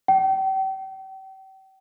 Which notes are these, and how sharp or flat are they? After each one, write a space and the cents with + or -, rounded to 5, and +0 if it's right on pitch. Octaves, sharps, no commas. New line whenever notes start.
G5 -35